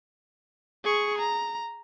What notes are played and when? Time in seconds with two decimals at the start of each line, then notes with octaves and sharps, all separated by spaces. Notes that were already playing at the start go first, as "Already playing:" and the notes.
0.84 G#4 C#6
1.19 A#5